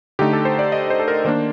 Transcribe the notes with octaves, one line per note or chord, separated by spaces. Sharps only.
D3 A3 D#4 G4
A4
C5
D5
D#5
C5
A4
A#4
D#3 A#3 D4 C5